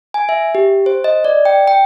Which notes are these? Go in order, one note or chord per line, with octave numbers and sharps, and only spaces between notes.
G#5
E5
G4
C5
D#5
D5
G5
G5